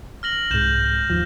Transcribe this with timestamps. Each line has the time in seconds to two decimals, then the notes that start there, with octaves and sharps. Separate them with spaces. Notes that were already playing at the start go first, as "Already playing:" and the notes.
0.23 F6 A#6 F#7
0.51 C2 G#2 G6 E7
1.10 D#2 F3